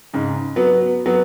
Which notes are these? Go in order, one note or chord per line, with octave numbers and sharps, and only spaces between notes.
G#2 C#3
F#3 B3
F#3 B3